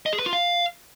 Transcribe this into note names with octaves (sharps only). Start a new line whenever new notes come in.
D#5
G#4
B4
F4
F5